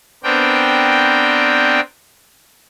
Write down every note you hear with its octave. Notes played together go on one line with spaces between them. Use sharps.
B3 C4 D4 A#4 G5